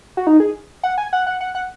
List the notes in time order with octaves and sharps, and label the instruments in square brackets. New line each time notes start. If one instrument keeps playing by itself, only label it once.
[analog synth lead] F#4
D#4
G#4
F#5
G#5
F#5
F#5
F#5
F#5